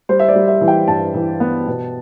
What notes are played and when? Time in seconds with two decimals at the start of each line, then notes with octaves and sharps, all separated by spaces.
0.09 G3 C5
0.19 E5
0.29 D5
0.36 G3
0.48 E5
0.61 E3
0.68 G5
0.88 G2 A5
1.15 E3
1.40 B3
1.67 B2